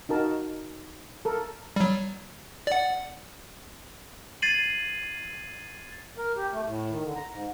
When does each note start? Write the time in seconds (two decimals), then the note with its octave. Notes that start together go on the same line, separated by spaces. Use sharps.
0.09 D#4 F#4 A#4 A5
1.25 A4 A#4
1.76 F#3 G3
2.67 D5 F#5
4.42 G#6 A6 C7 D#7 F#7
6.18 A#4
6.36 G4
6.53 A3
6.66 A2
6.90 D#3
7.03 D3
7.16 A#5
7.30 G#2